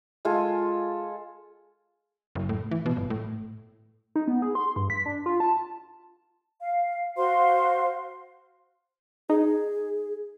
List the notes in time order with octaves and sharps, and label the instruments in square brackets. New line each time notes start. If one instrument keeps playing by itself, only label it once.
[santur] G#3 F4 A4 G#5
[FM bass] F#1
A2
E3
B2
G1
A2
[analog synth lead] D#4
B3
G#4
C6
G2
B6
D4
F4
A5
[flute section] F5
F#4 C5 F5 C6
[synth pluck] D#4 [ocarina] G#4